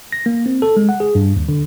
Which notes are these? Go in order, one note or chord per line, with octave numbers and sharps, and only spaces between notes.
A#6
A#3
C4
A4
G#3
F#5
G#4
G2
D#2
D3